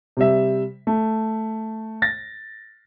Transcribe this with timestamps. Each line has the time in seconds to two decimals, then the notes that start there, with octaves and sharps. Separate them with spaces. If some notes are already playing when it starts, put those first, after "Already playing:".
0.17 C3 G3 E5
0.87 A3
2.02 A6 A#6